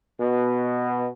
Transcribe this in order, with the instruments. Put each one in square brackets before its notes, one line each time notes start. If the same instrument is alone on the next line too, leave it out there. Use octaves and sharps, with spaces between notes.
[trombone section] B2